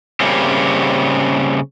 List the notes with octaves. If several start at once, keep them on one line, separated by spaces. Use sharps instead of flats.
C#3 G3 A#3 C4 C#4